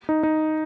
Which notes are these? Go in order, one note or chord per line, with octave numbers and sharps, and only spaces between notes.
D#4
D#4